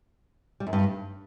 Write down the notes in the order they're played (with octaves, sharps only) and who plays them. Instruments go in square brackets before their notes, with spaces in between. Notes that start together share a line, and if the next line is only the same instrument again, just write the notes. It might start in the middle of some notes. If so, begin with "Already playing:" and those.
[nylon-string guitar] G3
F#2
G2